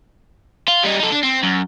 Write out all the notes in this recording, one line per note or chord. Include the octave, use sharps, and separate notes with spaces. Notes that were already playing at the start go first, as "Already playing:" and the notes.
F4
G3 D#4
D#4 A4
D4
C4
F#2